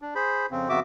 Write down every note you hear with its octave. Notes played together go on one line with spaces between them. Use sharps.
D4
G#4 C5 B5
F2 C#3 C4
F2 C#3 B3 F#4 E5 D6